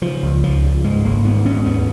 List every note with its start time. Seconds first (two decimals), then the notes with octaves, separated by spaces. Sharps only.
0.02 C#3 F3
0.23 C#2
0.43 C#2 F3
0.64 C#3
0.84 G#2 G#3
1.04 G#1 A#3
1.24 G#2 B3
1.45 G#2 C#4
1.66 D#2 B3